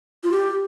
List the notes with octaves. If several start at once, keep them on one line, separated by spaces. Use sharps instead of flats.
F4
G4